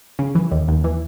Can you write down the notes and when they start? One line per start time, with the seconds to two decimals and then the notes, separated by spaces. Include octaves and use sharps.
0.19 C#3
0.35 E3
0.51 D#2
0.68 D#2
0.84 E3